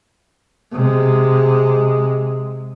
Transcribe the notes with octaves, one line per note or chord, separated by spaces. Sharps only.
C3 G#3